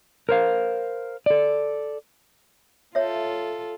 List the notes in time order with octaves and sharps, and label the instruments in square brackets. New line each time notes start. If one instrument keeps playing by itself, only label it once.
[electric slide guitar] A#4 C5 F5
A4 D5
[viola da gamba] F4 A4 [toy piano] C#5 E5